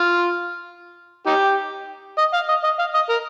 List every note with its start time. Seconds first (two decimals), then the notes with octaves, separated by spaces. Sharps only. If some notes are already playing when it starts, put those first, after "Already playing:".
Already playing: F4
1.26 D#4 G4
2.18 D#5
2.33 F5
2.49 D#5
2.64 D#5
2.79 F5
2.94 D#5
3.09 A#4